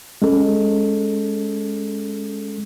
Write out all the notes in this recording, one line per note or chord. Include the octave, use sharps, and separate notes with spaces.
G#3 C#4 A4